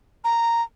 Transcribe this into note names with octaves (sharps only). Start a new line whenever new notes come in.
A#5